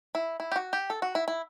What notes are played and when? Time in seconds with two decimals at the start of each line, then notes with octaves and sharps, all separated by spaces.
0.15 E4
0.40 E4
0.52 G4
0.56 F#4
0.73 G4
0.90 A4
1.02 F#4
1.15 E4
1.28 E4